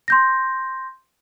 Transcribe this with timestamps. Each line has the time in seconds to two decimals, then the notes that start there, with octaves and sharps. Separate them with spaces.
0.08 C6 G6 A#6